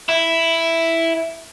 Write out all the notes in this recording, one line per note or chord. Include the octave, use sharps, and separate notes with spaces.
E4